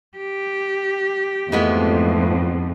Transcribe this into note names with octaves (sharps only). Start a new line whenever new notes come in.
G4
F2 G#2 E3 G#3 A3 B3